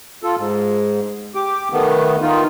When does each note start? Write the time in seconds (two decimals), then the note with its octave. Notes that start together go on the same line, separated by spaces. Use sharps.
0.23 F4 A4
0.38 G#2
1.35 G4 D6
1.72 D#3 A3 B3
2.22 D#3 D#4 F4